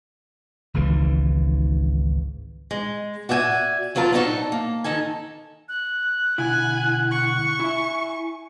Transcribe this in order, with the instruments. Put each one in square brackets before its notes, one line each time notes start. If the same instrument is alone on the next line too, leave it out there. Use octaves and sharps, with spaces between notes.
[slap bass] G#1 C#2 G#2 E3
[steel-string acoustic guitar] G#3
F#4 D5 E5 G5 G#5
D#2 F#3 F4 A#4 A5
B3 D4 D#4 G#4 A4 C#5
A#3
D#3 D#4 A4 G#5
[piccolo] F#6
[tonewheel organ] B2 D3 F#5 [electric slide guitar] E4 [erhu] G#5
[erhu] C#6
[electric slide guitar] E4 E5 [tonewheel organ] G#5